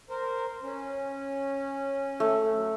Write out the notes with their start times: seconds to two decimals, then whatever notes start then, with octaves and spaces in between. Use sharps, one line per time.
0.09 A#4 C5
0.63 C#4
2.20 A3
2.54 F#3